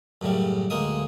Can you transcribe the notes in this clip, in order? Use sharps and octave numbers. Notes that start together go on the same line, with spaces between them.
F#2 A2 C#3 G3
D2 G#3 A#3 D#5 D#6